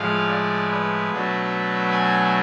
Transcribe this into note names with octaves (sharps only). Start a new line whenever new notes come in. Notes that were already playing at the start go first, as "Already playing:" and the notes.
Already playing: A2 F3 G#3 F5
D5
B4
B2 F#3 A3 D4
G#5